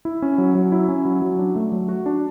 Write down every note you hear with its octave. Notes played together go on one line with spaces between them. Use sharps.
E4
C#4
F#3
F#3
E4
C#4
F#3
F#3
D4
A3
F#3
F#4
D4